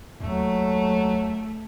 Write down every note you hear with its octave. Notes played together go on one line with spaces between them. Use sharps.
D#2 F#3 A3